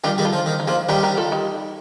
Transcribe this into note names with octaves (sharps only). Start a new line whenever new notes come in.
D#3 G3 D4 F4
D#3 G3
F4 A4
F3
D#3
D#4
F3 A#3 D4
D#3 G3 G4 A#4
G4 A#4
F4 A4
D#4 G4